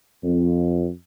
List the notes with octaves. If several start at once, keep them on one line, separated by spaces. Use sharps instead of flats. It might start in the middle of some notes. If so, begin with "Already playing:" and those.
F2